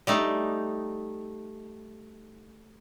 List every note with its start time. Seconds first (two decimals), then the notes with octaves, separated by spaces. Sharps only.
0.07 G3 A3 D#4